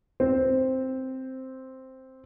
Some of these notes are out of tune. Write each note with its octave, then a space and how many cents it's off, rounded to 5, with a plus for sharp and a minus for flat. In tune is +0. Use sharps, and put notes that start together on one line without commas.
C4 +0 C5 +0